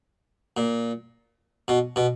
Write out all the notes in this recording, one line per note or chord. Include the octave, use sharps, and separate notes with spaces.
A#2
B2
B2